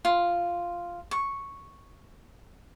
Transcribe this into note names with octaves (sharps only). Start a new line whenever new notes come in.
F4
C#6